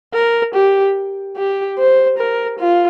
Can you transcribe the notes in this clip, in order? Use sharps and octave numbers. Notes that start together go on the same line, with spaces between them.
A#4
G4
G4
C5
A#4
F4